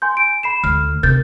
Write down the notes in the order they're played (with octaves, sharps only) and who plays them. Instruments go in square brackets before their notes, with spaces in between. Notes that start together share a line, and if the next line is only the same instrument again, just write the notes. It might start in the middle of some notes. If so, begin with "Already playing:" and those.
[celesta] G#5 C6 G6
D7
B5 C7 E7
[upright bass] D2 [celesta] F6
[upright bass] C3 [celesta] A#4 G6 A6